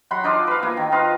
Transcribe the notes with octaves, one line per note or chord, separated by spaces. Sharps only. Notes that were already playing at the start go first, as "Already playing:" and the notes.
F#3 F#5 B5 C6
D#4 F4 D5 A5
B4 F5
A#3 E4
D#3
F4 B4 D#5 F5